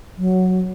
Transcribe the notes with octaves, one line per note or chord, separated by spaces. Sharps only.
F#3